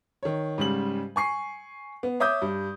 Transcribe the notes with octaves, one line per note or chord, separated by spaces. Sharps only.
D#3 C#5
G#2 C#3 G3 F#7
G#5 C#6 C7
B3
C#5 E5 D6 D#6 G6
G2